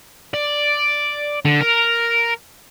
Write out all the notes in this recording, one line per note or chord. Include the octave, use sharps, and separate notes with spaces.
D5
D3
A#4